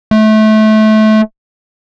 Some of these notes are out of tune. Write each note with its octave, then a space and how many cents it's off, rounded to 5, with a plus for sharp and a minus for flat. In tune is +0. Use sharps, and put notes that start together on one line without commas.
A3 -25